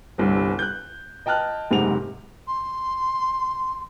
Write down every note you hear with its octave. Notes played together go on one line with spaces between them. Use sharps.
G1 C2 G2
F#6 G6
D#5 G5 A5 F6 F#6
F#1 G#2 C3 F#5 F7
C6